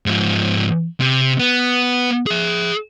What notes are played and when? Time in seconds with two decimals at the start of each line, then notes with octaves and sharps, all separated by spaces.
0.06 G#2 F3
1.00 C3
1.39 B3
2.26 G#4 E5